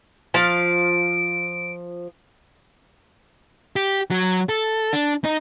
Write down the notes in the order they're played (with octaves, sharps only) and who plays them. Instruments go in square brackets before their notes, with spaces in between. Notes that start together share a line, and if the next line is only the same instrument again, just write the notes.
[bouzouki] F3 F5 [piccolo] D7
[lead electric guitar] G4
F#3
A4
D4
D#4